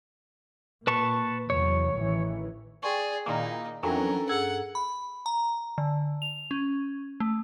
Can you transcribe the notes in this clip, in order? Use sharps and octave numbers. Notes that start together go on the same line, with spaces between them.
A#2 B4 A5 C#6
E2 C3 F#3 C#5
A1 D#3 E3
G#4 D5 G5 C6 C#6
A#2 D#3 A#3 D#4 E4
F2 E3 F#3 C#4 D4 A4 A#4 G5
G2 G#4 F#5 E6 G#6
B5
A#5
D3
F7
C#4
A3